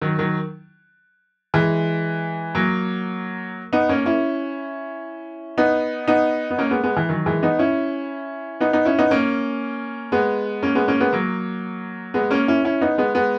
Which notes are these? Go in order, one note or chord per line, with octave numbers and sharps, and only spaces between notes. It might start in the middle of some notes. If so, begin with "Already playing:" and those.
D#3 F#3
D#3 F#3
E3 G#3
F#3 A#3
B3 D#4
A#3 C#4
C#4 E4
B3 D#4
B3 D#4
B3
A#3 C#4
G#3 B3
G#3 B3
E3
D#3 F#3
E3 G#3
B3 D#4
C#4 E4
B3 D#4
B3 D#4
C#4 E4
B3 D#4
A#3 C#4
G#3 B3
A#3 C#4
G#3 B3
A#3 C#4
G#3 B3
F#3 A#3
G#3 B3
A#3 C#4
C#4 E4
C#4 E4
B3 D#4
G#3 B3
G#3 B3